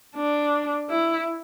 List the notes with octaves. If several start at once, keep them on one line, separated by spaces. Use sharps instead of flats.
D4
E4